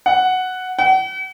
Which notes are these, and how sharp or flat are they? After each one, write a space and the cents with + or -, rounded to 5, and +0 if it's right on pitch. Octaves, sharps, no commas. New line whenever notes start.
F#5 +0
F#5 +40